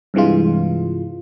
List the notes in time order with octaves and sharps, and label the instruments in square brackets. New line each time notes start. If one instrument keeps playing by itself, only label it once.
[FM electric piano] G2 C3 E3 G#3 F4